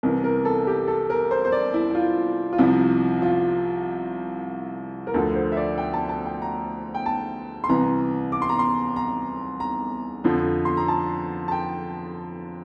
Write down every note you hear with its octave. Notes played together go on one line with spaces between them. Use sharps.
C2 C3 E3 A#4
A#4
A4
G4
A4
A#4
C5
C5
D5
E4
E4
F4
F4
C2 C3 F3 E4
F4
A#4
D2 D3 F3 A4
C5
E5
D5
G5
A5
A5
G5
A#5
G5
A5
C6
C2 C3 E3 A#5
D6
C6
A#5
C6
A#5
A#5
F2 D3 F3
C6
A#5
A5
A5
G5